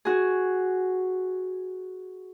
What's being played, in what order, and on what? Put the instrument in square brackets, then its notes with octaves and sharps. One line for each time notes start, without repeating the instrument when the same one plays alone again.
[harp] F#4 G#4